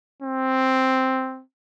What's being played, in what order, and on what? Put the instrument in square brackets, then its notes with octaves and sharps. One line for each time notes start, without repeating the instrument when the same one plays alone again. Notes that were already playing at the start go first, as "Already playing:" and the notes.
[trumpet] C4